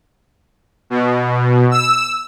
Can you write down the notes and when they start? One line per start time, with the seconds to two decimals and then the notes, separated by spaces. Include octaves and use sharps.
0.90 B2
1.71 E6